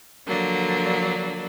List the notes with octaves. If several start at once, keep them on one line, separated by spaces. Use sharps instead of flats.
D3 F3 F#3 A#3 D4